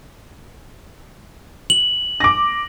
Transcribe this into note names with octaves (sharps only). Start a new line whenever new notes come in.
F#7
D6 A#6